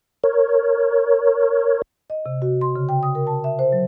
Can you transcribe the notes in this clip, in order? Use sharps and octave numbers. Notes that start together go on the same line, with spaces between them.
A#4 C#5
D#5
C3
F#4
C6
C#3
G5
D#6
A#4
A5
E5
C5
F#3